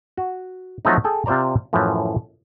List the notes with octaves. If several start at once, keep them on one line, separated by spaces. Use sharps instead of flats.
F#4
F3 F#3 A3 C4 D#4
G#4 A4 G5
C3 F4 C5 D5 A#5
F#2 A2 E3 F3